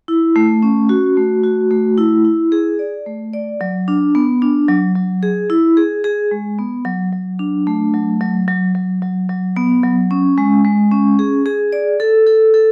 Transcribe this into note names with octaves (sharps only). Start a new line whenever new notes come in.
E4
A3
C#4
F#4
A3
F#4
A3
E4
E4
G#4
D5
A3
D5
F#3
D4
B3
D4
F#3
F#3
G#4
E4
G#4
G#4
G#3
B3
F#3
F#3
D4
A3
F#3
F#3
F#3
F#3
F#3
F#3
B3
F#3
C#4
G#3
G#3
C#4
G#4
G#4
D5
A4
A4
A4